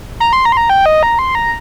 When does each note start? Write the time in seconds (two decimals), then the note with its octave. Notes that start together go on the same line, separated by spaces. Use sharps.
0.20 A#5
0.33 C6
0.45 A#5
0.52 C6
0.57 A#5
0.70 G5
0.86 D#5
1.03 A#5
1.19 C6
1.35 A#5